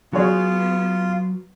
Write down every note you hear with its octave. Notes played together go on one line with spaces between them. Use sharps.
F#3 B3 F4 F#4 G#4 C#5